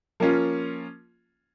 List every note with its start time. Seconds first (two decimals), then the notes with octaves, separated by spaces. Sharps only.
0.20 F3 A#3 C#4 F4